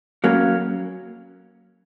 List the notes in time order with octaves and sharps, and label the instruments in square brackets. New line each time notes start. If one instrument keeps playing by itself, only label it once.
[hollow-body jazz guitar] F#3 A#3 C#4